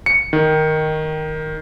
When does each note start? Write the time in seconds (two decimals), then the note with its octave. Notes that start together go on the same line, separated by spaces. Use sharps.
0.06 C#7
0.33 D#3